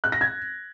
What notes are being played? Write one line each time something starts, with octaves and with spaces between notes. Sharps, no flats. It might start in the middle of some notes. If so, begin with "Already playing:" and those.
F#6
A#6
G#6